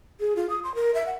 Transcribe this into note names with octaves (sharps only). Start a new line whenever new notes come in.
G#4
F4
D#6
C6
A#4
E5
F#5